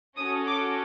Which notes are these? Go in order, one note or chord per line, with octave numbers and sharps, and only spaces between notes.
C#4 F#4 A4 D#6
D6